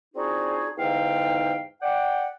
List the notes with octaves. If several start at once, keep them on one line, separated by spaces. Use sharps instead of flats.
C4 D4 D#4 F4 F#4 G#4
E2 G#2 D3 D#4 F5 G5
D5 F#5 G5